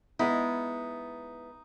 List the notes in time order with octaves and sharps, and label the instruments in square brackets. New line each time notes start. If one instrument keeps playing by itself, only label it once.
[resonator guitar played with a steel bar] G#3 B3 E4 [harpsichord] D#4